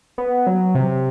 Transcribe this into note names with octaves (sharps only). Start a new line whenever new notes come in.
B3
F#3
C3